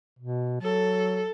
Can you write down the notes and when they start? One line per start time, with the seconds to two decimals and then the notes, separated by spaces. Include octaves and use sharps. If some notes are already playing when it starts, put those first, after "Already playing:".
0.19 B2
0.62 F#3 A4